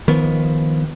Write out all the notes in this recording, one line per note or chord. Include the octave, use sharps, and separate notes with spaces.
D#3 F3 B3